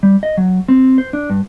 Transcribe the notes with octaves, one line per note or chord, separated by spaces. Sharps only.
G3
D#5
F#3
C4
C5
D4
G2